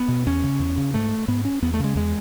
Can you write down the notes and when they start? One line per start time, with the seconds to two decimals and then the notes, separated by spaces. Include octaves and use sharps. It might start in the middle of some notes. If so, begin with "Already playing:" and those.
Already playing: B3
0.08 B2
0.27 E2 C#4
0.43 C#3
0.59 E2
0.78 C#3
0.94 G#2 A3
1.28 G#2 B3
1.45 C#4
1.62 E2 B3
1.74 A3
1.80 C#3 G#3
1.95 E2 G#3